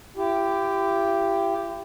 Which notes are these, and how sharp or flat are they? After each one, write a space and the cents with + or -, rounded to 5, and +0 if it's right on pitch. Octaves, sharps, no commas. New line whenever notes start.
E4 +40 G4 +0